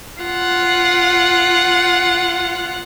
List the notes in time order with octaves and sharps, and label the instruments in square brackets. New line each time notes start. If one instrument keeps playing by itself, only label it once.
[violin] F4 F#5